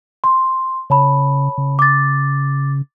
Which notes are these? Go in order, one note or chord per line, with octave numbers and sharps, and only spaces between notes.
C6
C#3 C#5 A5 B5
C#3
D6 A6